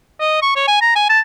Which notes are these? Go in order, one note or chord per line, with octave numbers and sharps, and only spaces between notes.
D#5
C#6
C#5
G#5
A#5
G#5
A5